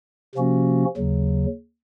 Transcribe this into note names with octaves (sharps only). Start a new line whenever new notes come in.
C3 F3 A#3 C#4 F#4
D#2 C#3 F#3